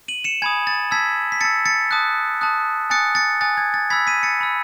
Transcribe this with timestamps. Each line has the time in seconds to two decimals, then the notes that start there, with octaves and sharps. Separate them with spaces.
0.08 D#7 F#7
0.24 C#7 E7
0.42 G#5 B5 D#6 G#6
0.67 A6
0.91 A5 E6 G#6 B6
1.32 B6
1.41 A5 E6 A6 C#7
1.66 A6 C#7
1.91 A5 D#6 F#6
2.41 A5 D#6 F#6
2.90 G#5 D#6 F#6 A6 C#7
3.15 A6 C#7
3.41 G#5 D#6 F#6 A6
3.57 G#6
3.74 A6
3.90 B5 E6 G#6 B6
4.07 B6 D#7
4.23 A6 C#7
4.41 B5 E6